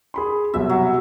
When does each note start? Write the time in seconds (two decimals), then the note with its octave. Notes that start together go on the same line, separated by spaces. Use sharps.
0.14 G#4 B5 C6
0.54 C2 F#2 B2 E5
0.69 F#3